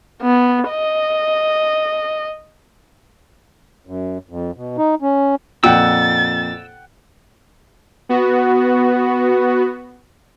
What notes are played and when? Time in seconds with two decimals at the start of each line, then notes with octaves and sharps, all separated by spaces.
0.22 B3
0.69 D#5
3.87 F#2
4.29 F2
4.56 B2
4.78 D#4
5.02 C#4
5.64 F2 A#2 F#5 G5 E6 A6
8.09 B3 F#4